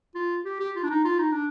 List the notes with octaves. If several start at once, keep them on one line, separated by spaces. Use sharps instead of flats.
F4
G4
G4
F4
D4
D#4
F4
D#4
D4